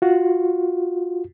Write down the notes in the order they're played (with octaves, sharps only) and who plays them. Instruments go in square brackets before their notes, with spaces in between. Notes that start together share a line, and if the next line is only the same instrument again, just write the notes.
[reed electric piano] F4 F#4